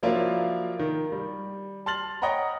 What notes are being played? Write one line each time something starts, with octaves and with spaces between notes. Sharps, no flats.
F3 F#3 A#3 D4 E4 F4
D#3
G3
A5 C6 F6 A6 F#7
C#5 D#5 F#5 G5 A#5 B5